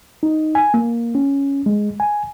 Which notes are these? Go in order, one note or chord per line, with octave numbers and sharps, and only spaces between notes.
D#4
G#5
A#3
C#4
G#3
G#5